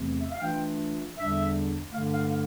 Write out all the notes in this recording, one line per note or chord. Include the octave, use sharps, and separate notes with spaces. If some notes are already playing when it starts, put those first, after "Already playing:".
Already playing: E2 C3 E3 A3 C4
E5
F5
E3 A3 D4 F4 G5
E2 D3 G3 D4 E5
G2 D3 A3 D4 F5
F5
F5